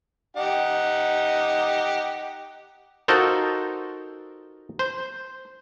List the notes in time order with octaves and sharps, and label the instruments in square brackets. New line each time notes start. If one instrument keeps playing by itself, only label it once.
[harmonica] D#4 G4 F#5
[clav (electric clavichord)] D#4 F4 F#4 A4 A#4 C5
C5